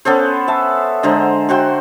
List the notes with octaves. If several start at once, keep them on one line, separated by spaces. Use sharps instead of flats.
B3 C#4 A4 C5
E5 A5
D3 G#3 C5 A#5
F#4 C5 G5 C6